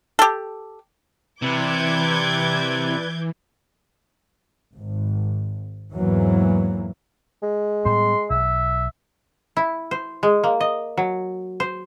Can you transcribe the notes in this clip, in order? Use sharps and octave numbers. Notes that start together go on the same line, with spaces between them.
G4 A4
C3 E3 E4 B4 D5 D6 G6 G#6
G#1
E2 G#2 E3 F#3 A#3
G#3
A2 G3 B3 C6
B1 E5
E4
C5
G#3
A#3
D#5
F#3
C5